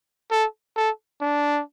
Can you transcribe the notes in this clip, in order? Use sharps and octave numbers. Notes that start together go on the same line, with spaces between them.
A4
A4
D4